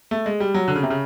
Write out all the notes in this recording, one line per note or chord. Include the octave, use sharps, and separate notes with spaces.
A3
G#3
G3
F#3
D3
C#3
C3
C#3